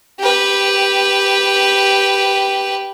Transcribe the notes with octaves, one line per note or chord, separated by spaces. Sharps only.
G4 B4